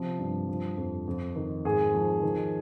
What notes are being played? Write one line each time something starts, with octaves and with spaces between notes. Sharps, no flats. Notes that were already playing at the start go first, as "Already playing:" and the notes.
Already playing: C3 F3
G2
F3
F2
F2
D#3
G#2 G#4
F3
D#3